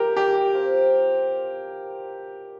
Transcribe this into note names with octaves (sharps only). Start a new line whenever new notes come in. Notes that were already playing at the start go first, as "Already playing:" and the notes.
Already playing: C4 F4 G4 A#4 D#5
G4
C4 F4 C5